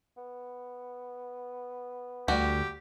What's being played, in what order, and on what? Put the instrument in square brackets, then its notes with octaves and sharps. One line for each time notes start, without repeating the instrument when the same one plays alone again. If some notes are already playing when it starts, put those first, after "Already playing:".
[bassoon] B3
[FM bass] D2 [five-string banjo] G3 F#4 [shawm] G4